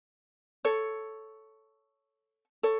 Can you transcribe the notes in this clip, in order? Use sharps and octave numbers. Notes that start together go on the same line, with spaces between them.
A4 C#5
A4 C#5